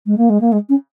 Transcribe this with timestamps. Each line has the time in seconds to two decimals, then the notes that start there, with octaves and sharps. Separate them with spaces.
0.06 G#3
0.17 A#3
0.29 G#3
0.41 A#3
0.52 G#3
0.69 C#4